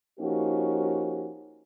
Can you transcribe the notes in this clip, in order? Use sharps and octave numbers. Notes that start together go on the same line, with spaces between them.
F3 A#3 C#4 D#4 F#4 G4